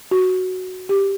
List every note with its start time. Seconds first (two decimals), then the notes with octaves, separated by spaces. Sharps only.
0.11 F#4
0.89 G4